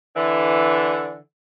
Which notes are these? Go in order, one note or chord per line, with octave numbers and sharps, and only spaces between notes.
D3 E3